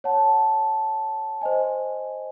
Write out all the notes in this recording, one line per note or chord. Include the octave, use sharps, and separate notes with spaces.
C#5 F#5 A5
C5 D#5 G#5